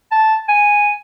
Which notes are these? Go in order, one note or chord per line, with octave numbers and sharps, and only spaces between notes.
A5
G#5